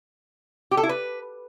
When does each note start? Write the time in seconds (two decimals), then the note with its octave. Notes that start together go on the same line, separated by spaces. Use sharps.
0.71 G4
0.77 A4
0.83 E4
0.89 B4